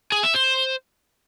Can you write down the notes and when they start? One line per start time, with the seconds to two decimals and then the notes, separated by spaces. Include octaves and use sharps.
0.12 G#4
0.23 E5
0.35 C5